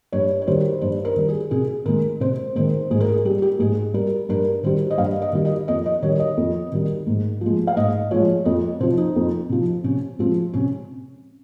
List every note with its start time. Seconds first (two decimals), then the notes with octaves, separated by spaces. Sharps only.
0.12 G2 C#5
0.41 C#5
0.47 D#3 G3 C5
0.81 G2 C5
1.05 A#4
1.16 D#3 G3
1.28 G#4
1.51 C3 G#4
1.86 D#3 G#3 A#4
2.20 C3 C5
2.55 D#3 G#3 C5
2.91 G#2 G#4
3.01 A#4
3.08 G#4
3.25 G3 G4
3.42 G4
3.59 G#2 G#4
3.94 G3 A#4
4.29 G2 A#4
4.63 D#3 G3 C5
4.91 D#5
4.98 G2 F5
5.22 D#5
5.33 D#3 G3
5.45 D#5
5.68 F2 D#5
5.86 D#5
6.02 D#3 G3 C#5
6.20 D#5
6.37 F2
6.72 D#3 G3
7.07 G#2
7.41 F3 G#3
7.67 F5
7.76 G#2 D#5
8.11 F3 G#3 C#5
8.45 F2 D#5
8.80 C3 F3 C5
8.98 D#4
9.16 F2
9.49 C3 F3
9.84 C3 C#4
10.19 F3 G#3 C4
10.53 C3 C#4